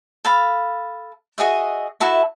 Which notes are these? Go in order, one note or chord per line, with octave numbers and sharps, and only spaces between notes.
A4 F5 B5
F#4 G#4 D#5 E5
E4 F#4 A4 E5